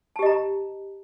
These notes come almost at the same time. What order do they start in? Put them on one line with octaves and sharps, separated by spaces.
A5 G4 D#5 A#5